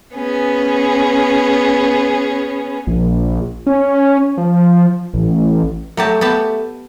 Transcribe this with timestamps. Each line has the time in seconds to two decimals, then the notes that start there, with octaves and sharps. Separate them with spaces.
0.14 B3 C#4 G#4
2.87 A#1
3.67 C#4
4.38 F3
5.14 A1
5.97 F#3 A3 G4 A5
6.21 B3 G4 A5